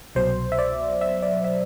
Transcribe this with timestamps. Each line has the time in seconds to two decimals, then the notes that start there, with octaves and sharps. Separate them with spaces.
0.15 C2 B2 F#3 C5
0.52 E5
0.59 D5
1.01 E5
1.22 D5
1.44 E5